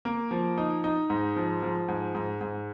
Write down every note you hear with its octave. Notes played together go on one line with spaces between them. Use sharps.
A#3
F3
D#4
D#4
G#2
F3
F3
G#2
G#2
G#2